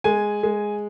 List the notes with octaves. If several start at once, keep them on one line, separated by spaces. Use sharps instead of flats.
G#3 G#5
G#3